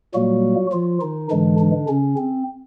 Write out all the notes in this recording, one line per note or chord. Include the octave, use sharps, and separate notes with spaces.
A#2 F#3 G3 A#3 F#4
F3 F4
D#3 D#4
G#2 D3 E3 G#3 D4
D3 D4
C#3 C#4
C4